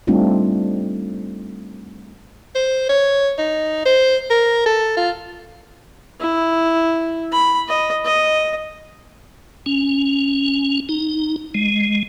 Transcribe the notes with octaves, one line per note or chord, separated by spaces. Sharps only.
G3 A3 C4 D4 D#4 F4
C5
C#5
D#4
C5
A#4
A4
F4
E4
B5
D#5
D#5
C#4
D#4
G#3